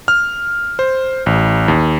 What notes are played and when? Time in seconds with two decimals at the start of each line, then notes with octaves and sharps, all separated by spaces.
0.08 F6
0.79 C5
1.26 A1
1.68 D#2